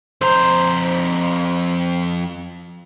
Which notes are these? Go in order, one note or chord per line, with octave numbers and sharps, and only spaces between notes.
F2 C5 A#5